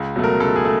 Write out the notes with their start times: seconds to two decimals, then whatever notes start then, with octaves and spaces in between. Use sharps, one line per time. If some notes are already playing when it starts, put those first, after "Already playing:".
Already playing: C#2
0.16 B2 F#3 A3
0.24 A#4
0.40 C#2 A4
0.56 G#4
0.65 A3